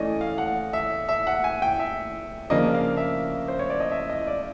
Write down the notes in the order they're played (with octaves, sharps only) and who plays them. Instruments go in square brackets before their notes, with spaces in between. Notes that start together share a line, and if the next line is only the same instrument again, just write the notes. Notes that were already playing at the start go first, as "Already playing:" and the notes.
Already playing: [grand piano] E3 A3 C#4 D5 D#5
F5
F#5
E5
E5
F#5
G#5
G5
E5
C#3 F3 A#3 D4 D#5
F5
E5
C5
C#5
D5
D#5
E5
D#5
D5